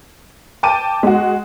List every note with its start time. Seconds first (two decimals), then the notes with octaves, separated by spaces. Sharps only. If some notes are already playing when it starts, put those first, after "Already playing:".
0.63 G5 A5 D6 D#7
1.03 G#3 F#4